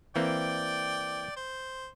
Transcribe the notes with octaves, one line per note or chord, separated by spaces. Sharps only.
E3 A#3 C4 D5 G5
C5